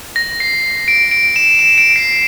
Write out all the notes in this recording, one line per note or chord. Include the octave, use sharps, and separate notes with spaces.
A#6
C7
D7
D7
E7
E7
D7
C7